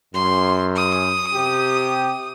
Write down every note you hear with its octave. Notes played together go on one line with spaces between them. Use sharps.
F#2 C6
D#6
C3 G4